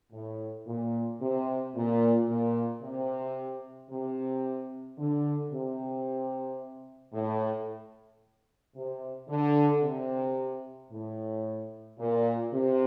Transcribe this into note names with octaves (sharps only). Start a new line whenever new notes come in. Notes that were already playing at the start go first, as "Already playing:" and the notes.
A2
A#2
C3
A#2
A#2
C3
C3
D3
C3
A2
C3
D3
C3
A2
A#2
C3